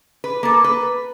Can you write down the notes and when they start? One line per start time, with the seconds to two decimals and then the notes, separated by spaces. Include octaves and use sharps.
0.24 B4
0.43 A#3 A4
0.64 B4